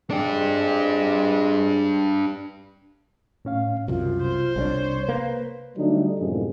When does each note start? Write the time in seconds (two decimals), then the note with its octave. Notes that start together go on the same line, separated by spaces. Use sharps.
0.11 F2 G#3 D4 G4 G#4
3.45 A2 C#4 F5
3.88 C2 F#2 C3 F4
4.22 C5
4.56 C2 G3 D4 C#5
5.09 A#3 B4
5.77 D3 F#3 G3 A3 D4 D#4
6.19 F#2 A2 C3 D#3 F3 G#3